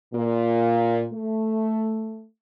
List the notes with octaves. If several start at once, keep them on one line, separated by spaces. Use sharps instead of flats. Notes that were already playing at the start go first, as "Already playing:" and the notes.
A#2
A3